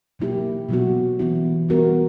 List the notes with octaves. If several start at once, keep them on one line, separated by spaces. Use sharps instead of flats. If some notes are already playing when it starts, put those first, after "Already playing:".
B2 F#3 A#3 E4 G4
B2 F#3 B3 F#4
E3 B3 E4
G3 B3 F#4 A#4